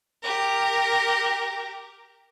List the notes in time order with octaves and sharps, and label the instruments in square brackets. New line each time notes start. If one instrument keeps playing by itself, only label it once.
[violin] G4 A#4